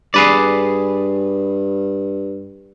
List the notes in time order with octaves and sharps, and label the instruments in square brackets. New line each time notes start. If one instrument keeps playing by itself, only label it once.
[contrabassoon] G2 [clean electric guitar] G#4 B4 D5